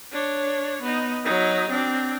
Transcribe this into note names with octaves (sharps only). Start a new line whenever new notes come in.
D4 C#5
B3 D#4
F#3 D#4
C4 D4